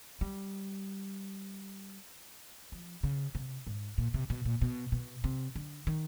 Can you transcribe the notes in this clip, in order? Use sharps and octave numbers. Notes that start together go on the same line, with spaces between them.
G3
F3
C#3
C3
G#2
A#2
C3
B2
A#2
B2
B2
C3
D3
D#3